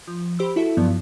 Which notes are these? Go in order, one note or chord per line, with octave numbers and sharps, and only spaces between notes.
F3
G4 C5 B5 C6 E6
E4 F#4 A4 E5
G2 F3 F#3 B3